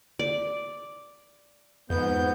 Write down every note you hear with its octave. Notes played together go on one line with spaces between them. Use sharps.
D5
F2 G#2 B3 G6